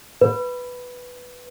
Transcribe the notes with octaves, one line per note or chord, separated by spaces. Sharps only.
B4